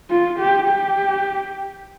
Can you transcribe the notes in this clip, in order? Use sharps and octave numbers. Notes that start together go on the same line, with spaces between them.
F4
G4
G4